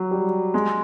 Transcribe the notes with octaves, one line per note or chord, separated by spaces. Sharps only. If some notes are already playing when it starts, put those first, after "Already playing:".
Already playing: F#3
G3
G#3